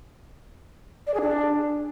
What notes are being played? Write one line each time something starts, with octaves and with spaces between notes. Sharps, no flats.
D5
G#4
D4